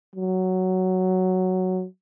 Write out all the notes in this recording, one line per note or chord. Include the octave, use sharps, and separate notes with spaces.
F#3